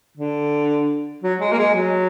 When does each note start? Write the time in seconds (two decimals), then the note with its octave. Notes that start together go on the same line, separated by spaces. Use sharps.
0.18 D3
1.23 F#3
1.40 G#3
1.52 A#3
1.58 G#3
1.75 F#3